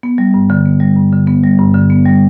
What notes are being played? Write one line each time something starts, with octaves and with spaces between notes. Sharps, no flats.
B3
G3
G2
D3
B3
G3
G2
D3
B3
G3
G2
D3
B3
G3